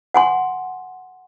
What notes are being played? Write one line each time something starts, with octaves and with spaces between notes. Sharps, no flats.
F#5 G#5 C6